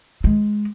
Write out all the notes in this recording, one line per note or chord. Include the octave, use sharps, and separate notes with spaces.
G#3